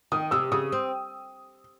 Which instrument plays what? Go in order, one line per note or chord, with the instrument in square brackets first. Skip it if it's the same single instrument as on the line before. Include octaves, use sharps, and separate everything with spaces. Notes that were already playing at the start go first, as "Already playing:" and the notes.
[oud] D#3 [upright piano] D#6
[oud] C3 [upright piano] E6
[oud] C#3 [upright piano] D#6
[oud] C4